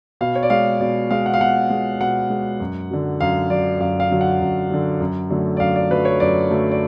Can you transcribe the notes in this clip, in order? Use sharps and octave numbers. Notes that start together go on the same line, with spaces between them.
B2 F5
C#5
D5
G#3 F5
B2 D5
G#3 F5
F#5
F5
B2 F#5
G#3
B2 F#5
G#3
F#2
D3 F#3
F#2 F5
D3 F#3 D5
F#2 F5
F5
D3 F#3
F#5
F#2
D3 F#3
F#2
D3 F#3 A3
D5
F#2 F5
D5
D3 F#3 A3 B4
C#5
F#2 D5
D3 F#3 A3
D5